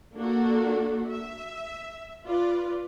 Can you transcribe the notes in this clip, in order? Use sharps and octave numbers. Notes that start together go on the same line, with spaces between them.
A#3 D4 F#4 A4
E5
F4 B4 D5